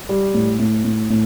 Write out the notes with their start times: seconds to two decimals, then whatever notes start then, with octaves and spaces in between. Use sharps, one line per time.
0.09 G3
0.34 A2
0.59 A2
0.85 A2
1.10 A2